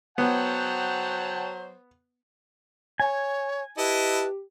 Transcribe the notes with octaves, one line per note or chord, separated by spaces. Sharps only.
F#3 B3 C5 C#5 F#5 G5 A5
C#5 G#5
E4 G4 B4 D#5 A5